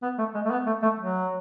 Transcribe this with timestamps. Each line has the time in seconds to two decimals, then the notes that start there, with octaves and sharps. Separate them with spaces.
0.02 B3
0.18 A3
0.35 G#3
0.45 A3
0.51 B3
0.67 A3
0.83 A3
0.99 F#3